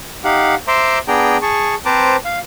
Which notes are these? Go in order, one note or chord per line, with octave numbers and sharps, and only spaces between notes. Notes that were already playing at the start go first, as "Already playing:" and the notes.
D#4 G4 F5 F#5
C5 E5 A#5 C6 D6
B3 D4 G#4 G5 A#5
G#4 A5 C#6
C4 B4 C5 A5 A#5 D6
F5